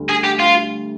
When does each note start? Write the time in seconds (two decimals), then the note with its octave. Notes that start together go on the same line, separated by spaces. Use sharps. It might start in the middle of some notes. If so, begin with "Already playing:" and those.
Already playing: D2 D3 G3
0.09 G#4
0.24 G4
0.40 F4